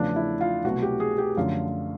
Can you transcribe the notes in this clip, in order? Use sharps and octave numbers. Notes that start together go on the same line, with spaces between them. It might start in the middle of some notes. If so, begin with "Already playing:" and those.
Already playing: E2 C#3 F3 A3 D4
E4
F4
C2 B2 F#3 A3 F#4
G4
G#4
G4
F#2 D3 F3 A3 F4